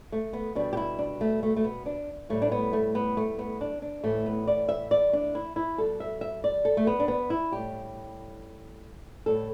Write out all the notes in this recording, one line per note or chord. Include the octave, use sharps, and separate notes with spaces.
A3
B3
B2 G3 D4
G4
E4
D4
A3
A3
A3
B3
D4
A2 G3 A3
D4
B3
A3
B3
A3
B3
D4
D4
A2 E3 G3 A3
B3
D5
E5
D5
D4
E4
E4
B2 G3 A4
E5
E5
D5
A4
A3
B3
D4
B3
E4
A2 G3 G4
A2 G3 A4